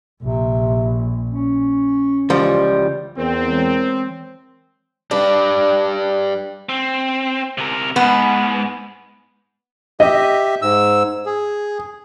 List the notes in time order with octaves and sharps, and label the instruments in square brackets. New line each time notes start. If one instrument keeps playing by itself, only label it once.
[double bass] A#1 [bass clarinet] C3
[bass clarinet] C#4
[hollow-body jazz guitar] C#2 F3 G3 [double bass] E3
[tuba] E2 [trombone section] C4 [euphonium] A#4
[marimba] E3 G#3 C#5
[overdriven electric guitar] G3 B4 [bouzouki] D4
[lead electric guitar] C4
C3 A#4
[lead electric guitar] F2 G#2 [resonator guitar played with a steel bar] B3
[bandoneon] G4 E5 [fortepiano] D#5
[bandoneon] G#2 E6
G#4